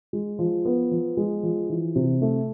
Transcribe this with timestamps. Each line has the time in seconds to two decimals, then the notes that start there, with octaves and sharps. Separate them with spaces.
0.13 G#3
0.39 F3
0.65 B3
0.91 F3
1.17 G#3
1.43 F3
1.69 E3
1.96 C3
2.21 A3